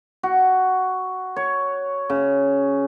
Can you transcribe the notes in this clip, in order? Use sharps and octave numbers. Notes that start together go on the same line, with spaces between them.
F#4
C#5
C#3